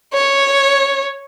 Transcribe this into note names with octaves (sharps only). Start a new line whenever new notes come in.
C#5